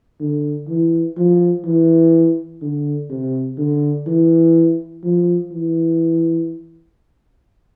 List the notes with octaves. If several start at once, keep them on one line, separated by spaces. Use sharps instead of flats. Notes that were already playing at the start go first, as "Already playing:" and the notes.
D3
E3
F3
E3
D3
C3
D3
E3
F3
E3